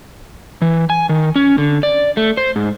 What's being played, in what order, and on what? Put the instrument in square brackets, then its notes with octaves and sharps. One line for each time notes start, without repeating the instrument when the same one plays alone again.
[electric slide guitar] E3
G#5
D#3
C#4
D3
D5
A3
C5
G#2